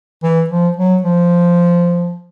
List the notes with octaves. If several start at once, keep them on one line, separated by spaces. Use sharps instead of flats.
E3
F3
F#3
F3